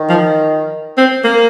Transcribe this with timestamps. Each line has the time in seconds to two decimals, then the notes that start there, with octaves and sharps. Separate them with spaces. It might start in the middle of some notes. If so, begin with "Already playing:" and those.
Already playing: D#3
0.09 F3
0.98 C4
1.24 A#3